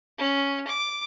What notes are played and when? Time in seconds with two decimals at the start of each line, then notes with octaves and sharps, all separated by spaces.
0.18 C#4
0.67 D6